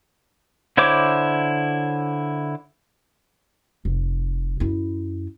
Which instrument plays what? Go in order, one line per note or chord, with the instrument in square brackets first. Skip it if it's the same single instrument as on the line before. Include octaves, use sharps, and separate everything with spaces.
[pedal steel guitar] D3 E4 C5 C#5 D6
[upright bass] F1
F#2 E4